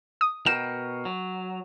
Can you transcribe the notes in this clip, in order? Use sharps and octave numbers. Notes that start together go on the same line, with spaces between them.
D#6
B2 A#4 G5 E7
F#3